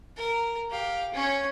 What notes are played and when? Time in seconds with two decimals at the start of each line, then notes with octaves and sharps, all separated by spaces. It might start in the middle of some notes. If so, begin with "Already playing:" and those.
0.16 A#4
0.70 G4 F5
1.14 C#4 C#5